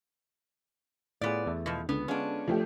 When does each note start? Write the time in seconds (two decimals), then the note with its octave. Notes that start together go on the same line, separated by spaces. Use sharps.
1.21 A2 B3 F4 G#4 D5
1.46 E2 A3 A4
1.66 B2 F3
1.89 C#2 D3 B3
2.08 G#3 B3 C#4 D4 F4
2.48 F3 A3 G4